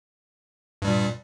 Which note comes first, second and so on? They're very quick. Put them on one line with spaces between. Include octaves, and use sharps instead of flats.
G2 G3 A#2